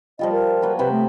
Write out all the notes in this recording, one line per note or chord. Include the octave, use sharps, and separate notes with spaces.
F3 G3 F4 D#5
A#4
F#3 A#3 B4
C3 B4 C5 B5
A3